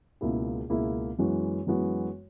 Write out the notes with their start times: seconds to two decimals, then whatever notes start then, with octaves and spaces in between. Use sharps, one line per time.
0.21 C#2 B2 A#3 E4 G#4
0.70 C#2 B2 A#3 E4 G#4
1.19 F#2 E3 G#3 B3 F#4
1.67 F#2 E3 G#3 B3 F#4